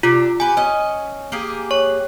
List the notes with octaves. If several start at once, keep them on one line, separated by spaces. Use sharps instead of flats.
C3 D4 F4
G4 B4 G#5
C#4 D#5
A#3 G4 G#4
C#5 C#6